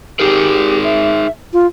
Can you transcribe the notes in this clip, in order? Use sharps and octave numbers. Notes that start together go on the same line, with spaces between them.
D#4 G4 G#4 A#4
E5
F4